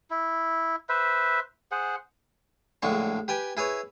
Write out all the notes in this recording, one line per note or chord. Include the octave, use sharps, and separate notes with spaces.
E4
B4 C5 E5
G#4 C5 F#5
A#1 A2 D3 G#3 C#6
G4 B4 G5 G#5
E4 G#4 B4 C#5